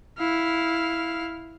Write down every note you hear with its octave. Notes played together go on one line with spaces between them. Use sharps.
E4 F5